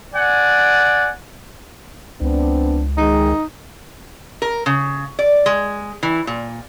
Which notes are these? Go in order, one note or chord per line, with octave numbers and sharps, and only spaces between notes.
D5 F#5 G#5
C#2 B3 C4 D4
D#3 G#3 D#4
A#4
C#3
D5
G#3
E3
A#2